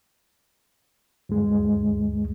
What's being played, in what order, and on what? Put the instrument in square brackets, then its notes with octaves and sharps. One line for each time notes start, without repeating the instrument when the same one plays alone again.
[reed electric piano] D2 G2 G#3